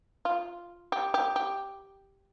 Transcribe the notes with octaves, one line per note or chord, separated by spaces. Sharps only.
F4
G4
G4
G4